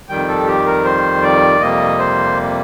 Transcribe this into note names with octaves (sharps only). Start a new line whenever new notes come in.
F2 D#3 G3 G5
A4
G4
A#4
C5
D5
F2 C3 G3 A#3 D#5
C5